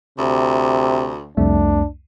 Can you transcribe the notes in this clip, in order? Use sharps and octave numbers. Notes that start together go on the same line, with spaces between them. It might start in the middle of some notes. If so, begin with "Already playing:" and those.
D2 C3
C2 F2 A3 D4